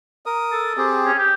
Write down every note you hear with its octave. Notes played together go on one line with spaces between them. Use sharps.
A#4 D#6
A4
C4 G4 G#4
C#4
G4